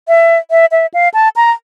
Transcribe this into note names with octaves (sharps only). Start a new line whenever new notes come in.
E5
E5
E5
F5
A5
A#5